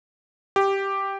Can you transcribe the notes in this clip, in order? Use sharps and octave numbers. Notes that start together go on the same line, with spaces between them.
G4